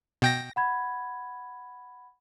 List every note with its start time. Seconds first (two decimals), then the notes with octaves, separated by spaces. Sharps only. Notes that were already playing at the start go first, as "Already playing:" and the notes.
0.22 B2 G5 A#6
0.56 F#5 B5 G#6